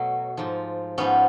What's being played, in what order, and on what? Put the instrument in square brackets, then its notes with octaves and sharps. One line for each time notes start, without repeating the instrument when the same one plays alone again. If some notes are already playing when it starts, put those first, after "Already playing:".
Already playing: [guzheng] B2 F#3 A3
G#2 F3
G#2 F3 B3 C#4